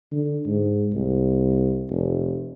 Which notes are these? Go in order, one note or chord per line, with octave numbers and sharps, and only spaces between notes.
D3
G#2
C2
F1